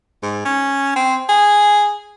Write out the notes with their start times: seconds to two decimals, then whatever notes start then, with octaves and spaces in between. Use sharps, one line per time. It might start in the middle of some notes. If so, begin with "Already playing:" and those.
0.23 G#2
0.45 C#4
0.96 C4
1.29 G#4